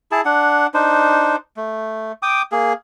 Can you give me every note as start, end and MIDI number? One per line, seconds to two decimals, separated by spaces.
0.12 0.21 64
0.12 0.21 68
0.12 0.21 81
0.25 0.67 62
0.25 0.67 78
0.74 1.36 62
0.74 1.36 63
0.74 1.36 72
1.57 2.12 57
2.23 2.42 79
2.23 2.42 86
2.23 2.42 87
2.52 2.73 58
2.52 2.73 68